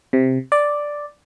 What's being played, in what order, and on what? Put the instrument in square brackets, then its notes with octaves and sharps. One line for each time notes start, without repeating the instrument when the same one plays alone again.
[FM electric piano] C3
D5